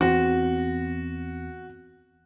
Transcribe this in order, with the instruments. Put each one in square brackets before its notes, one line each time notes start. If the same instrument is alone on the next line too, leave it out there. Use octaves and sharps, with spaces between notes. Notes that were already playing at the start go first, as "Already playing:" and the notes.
[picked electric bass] E2 C4 [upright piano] F#4